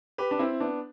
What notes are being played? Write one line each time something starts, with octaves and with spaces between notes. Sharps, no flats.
G4 B4
D4
C4 E4
B3 D4